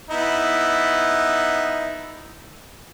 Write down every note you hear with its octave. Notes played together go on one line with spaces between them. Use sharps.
B3 D#4 E4